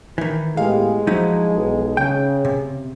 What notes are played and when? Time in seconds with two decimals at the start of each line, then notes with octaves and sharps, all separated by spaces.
0.18 D#3 E3
0.57 A2 G#3 B3 G4 F5
1.07 F3 F#3 D#4 E4
1.54 B1
1.97 C#3 G5
2.45 C3